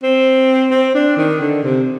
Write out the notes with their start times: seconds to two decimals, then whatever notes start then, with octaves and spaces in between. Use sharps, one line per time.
0.03 C4
0.71 C4
0.95 D4
1.17 D#3
1.40 D3
1.63 C3